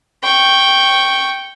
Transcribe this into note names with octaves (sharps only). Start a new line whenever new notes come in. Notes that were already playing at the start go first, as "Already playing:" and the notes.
G5 C#6